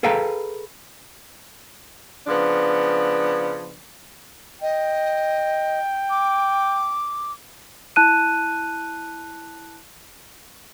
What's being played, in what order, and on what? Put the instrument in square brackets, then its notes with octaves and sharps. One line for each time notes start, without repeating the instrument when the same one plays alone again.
[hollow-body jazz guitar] G#4 A4 B4 F5 G5 A#5
[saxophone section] C#3 F3 B3 D4
[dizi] D#5 [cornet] G5
[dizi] D6
[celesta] E4 A5 F#6 D#7